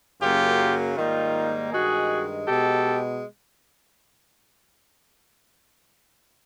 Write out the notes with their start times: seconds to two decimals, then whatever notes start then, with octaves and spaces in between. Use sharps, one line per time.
0.22 F#2 C#3 F#3 A#3 F4 G4
0.97 G#2 D#3 G3 A#3 D#4 F4
1.72 G2 D#3 G#3 F#4 G#4
2.47 B2 G#3 G4 A4